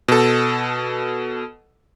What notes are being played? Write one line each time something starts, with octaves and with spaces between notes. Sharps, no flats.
B2 A4